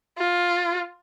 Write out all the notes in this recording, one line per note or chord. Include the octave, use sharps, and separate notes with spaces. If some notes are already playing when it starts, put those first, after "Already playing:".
F4